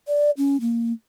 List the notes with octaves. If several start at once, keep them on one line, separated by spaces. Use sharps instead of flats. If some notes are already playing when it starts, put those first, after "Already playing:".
D5
C#4
A#3